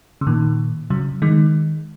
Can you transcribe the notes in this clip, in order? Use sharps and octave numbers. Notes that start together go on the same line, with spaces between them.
C#3
A#2 D#3
C#3 F#3
D#3 G#3